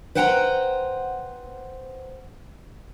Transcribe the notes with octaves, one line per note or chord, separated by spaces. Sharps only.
B4 C5 F#5 G5 A5 A#5